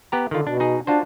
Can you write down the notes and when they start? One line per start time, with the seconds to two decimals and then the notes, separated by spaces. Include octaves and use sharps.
0.12 B3 G4 A#5
0.31 D3 D#3 F4
0.47 B2 D4
0.60 D#4 G#4
0.87 D4 F4 F#4 C5